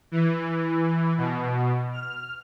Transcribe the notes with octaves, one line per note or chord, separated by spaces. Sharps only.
E3
B2
F6